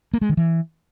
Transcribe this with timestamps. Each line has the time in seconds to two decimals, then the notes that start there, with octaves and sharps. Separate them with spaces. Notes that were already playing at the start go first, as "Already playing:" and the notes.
0.14 A#3
0.21 G#3
0.29 D#3
0.37 E3